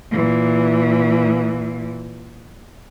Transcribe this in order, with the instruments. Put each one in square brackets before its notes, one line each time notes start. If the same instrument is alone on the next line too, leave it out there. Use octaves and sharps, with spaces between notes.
[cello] A#2 E3